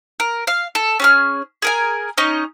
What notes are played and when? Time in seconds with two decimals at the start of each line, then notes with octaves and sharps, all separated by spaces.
0.20 A#4
0.47 F5
0.75 A4
1.00 C#4 G#4 F6
1.62 G#4 A#4 G#5
2.17 C#4 D#4 D#5